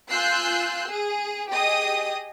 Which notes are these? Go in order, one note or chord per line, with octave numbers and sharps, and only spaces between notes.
F4 G#5 E6 F#6 G6 C7
G#4
G4 G#4 D#5 D#6